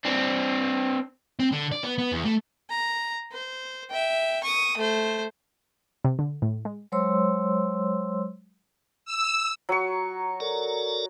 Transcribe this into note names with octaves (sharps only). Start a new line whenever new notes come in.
C4 D4
C4
D3
D5
B3
B3
E2
A3
A#5
C5
E5 G5
C#6 D#6
A3 C5
C3
D3
A2
G#3
F#3 G#3 C5 C#5 C6 E6
E6
F#3 C#6
A4 A#4 D5